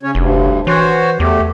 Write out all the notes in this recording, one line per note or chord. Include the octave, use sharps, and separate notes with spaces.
C#3 C#4 C#5
F1 D2 G2
E3 F#4 C5 C#5
E2 A3 G4